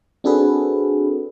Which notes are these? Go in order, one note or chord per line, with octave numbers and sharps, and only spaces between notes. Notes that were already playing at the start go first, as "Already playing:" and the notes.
C4 D4 F#4 G#4 A4 B4